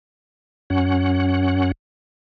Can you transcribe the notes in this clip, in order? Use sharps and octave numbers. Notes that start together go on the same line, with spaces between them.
F#2 C#4 F#5